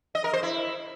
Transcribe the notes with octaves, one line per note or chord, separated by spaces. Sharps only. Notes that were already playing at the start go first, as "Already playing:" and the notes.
D#5
A#4
C5
E4